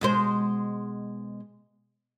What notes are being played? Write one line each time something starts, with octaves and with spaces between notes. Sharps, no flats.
B2 G#3 C5